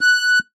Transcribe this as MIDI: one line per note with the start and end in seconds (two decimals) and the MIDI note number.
0.01 0.39 90